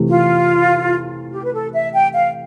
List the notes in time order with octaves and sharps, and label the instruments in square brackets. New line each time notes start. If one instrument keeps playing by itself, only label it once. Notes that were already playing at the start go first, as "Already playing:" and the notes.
Already playing: [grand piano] C3 E3 A3
[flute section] F4
G4
B4
A4
E5
G5
F5